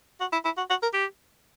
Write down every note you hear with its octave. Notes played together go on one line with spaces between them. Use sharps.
F#4
E4
E4
F#4
F#4
A#4
G4